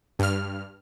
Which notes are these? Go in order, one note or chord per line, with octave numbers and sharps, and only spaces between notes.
G2 F6